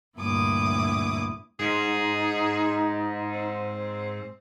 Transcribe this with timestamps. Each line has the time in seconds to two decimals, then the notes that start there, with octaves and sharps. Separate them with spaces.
0.18 D2 G2 A#2 E4 D6 D#6
1.60 G#2 D#4 G#4
3.33 C4